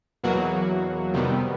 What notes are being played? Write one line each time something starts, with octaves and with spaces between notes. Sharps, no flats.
E2 B2 F#3 A#3 F#4
F2 C3 D#3 G3 B3